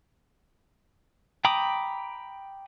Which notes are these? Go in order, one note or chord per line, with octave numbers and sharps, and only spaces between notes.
G5 A#5 B5 D6 D#6